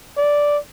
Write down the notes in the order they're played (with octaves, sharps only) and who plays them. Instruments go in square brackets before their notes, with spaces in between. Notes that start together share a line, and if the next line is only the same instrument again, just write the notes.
[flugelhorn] D5